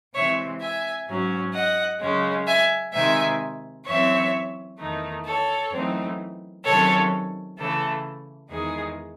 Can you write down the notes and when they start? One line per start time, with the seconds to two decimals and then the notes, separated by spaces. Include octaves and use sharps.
0.14 C3 E3 G#3 C4 C#5 E5
0.61 E5 G#5
1.08 G#2 F#3 C#4
1.54 D#5 F#5
2.00 F#2 C#3 G#3 C#4
2.47 E5 G#5
2.93 C3 D#3 G#3 D#4 E5 G#5
3.85 F#2 E3 C4 C#5 E5
4.79 E2 D#3 A3 D#4
5.25 A4 C#5
5.71 F#2 E3 A3 C4 D#4
6.64 C3 D#3 F#3 C#4 A4 C#5
7.57 C#3 E3 A3 A4
8.50 E2 D#3 G#3 D#4 G#4